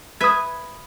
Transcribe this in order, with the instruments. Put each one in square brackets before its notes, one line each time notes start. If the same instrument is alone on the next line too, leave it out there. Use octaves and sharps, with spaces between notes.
[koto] B4 E5 [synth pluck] D#6 G#6